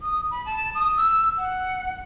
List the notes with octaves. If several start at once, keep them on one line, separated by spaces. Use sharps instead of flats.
D#6
B5
A5
D#6
E6
F#5